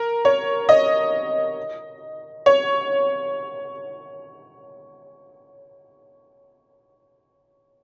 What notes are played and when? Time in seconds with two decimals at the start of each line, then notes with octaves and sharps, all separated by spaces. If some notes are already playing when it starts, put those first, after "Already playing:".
Already playing: A#4
0.25 C#5
0.69 D#5
2.46 C#5